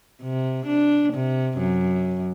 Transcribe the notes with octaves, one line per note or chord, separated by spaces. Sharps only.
C3
D4
C3
F#2